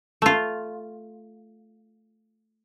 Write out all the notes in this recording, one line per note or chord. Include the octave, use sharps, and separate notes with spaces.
A3 F4